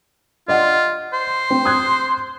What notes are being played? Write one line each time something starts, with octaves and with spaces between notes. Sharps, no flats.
F4 D5 D#5 F#5
C5
C4
D#6 F#6 G#6